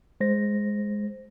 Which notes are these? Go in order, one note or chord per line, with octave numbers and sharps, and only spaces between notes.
G#3 C5 A#6